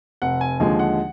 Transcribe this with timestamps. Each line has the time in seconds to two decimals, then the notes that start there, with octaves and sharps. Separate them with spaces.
0.22 F1 F#5
0.41 G#5
0.60 D#2 D3 F3 G#3 G#5
0.79 F#5